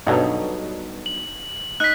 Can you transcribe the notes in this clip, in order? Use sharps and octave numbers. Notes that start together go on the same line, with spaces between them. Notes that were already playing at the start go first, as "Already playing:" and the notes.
G2 B2 F#3 D#4 A4 A#5
F#7
D#4 F#6 B6